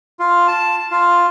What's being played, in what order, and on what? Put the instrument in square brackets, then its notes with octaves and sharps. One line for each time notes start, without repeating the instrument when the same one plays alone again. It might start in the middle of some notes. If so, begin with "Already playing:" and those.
[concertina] F4
A5
F4